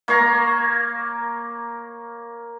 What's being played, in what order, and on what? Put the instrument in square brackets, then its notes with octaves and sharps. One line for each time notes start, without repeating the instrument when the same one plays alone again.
[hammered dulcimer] A#3 C#5 F5 A#5